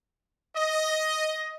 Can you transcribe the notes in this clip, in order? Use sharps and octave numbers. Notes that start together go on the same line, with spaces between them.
D#5